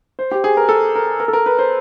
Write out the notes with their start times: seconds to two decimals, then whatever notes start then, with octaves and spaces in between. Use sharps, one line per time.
0.19 C5
0.31 G4
0.44 G#4
0.57 A#4
0.69 A4
0.95 A#4
1.20 A#4
1.28 A4
1.33 A#4
1.46 B4
1.59 C5